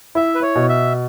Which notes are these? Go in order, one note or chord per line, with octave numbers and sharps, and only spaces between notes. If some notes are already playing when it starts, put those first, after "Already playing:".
E4 E5
B4
C#5
B2
E5